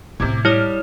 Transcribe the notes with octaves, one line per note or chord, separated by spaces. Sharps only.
A2 C3 A3 D6 G#6
G3 E4 C#5 D#6 F6